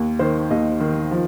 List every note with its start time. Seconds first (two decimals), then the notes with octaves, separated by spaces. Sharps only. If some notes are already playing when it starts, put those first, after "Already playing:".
Already playing: D#2
0.19 D#3 C5
0.51 D#2 D#5
0.80 D#3
1.11 F3